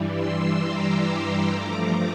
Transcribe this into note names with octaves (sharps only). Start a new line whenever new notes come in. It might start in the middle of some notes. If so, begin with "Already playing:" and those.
Already playing: G2 E3 G3
C6 E6
A#5 D6
G2 F3 A3